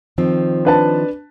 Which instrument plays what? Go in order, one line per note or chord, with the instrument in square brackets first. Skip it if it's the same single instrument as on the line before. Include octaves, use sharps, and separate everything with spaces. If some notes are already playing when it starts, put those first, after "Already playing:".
[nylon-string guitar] D#3 F3 C4
[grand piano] D4 B4 A5